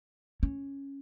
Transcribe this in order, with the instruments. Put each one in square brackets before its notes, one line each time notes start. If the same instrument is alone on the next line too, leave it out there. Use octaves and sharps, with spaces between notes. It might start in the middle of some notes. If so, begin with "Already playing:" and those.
[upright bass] C#4